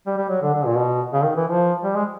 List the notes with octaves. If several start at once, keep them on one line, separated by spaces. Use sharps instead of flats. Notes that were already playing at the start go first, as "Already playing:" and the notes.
G3
G3
F#3
D3
D3
A#2
B2
C#3
D#3
E3
F3
G3
G#3